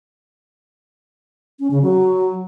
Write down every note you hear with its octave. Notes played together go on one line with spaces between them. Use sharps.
C#4
C#3
F#3